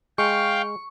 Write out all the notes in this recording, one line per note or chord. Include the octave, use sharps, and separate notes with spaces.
G#3 F5 G5 C#6